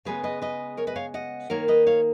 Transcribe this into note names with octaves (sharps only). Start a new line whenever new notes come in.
C#3 G#3 B3 G#4 B4
B4 D#5
B4 D#5
A#4 C#5
B4 D#5
C#5 F5
D#5 F#5
D#3 A#3 D#4 A#4 C#5
B4 D#5
C#5 F5